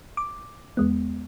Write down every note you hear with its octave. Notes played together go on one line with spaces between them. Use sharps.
D6
E2 G#3 B3